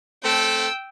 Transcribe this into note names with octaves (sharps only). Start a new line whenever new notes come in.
A3 C4 A4 G5 E6